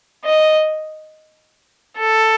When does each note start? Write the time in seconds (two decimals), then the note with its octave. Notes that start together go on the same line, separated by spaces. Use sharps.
0.25 D#5
2.00 A4